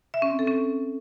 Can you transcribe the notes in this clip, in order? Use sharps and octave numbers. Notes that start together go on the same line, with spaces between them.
E5
C#4
C4
A4
C#4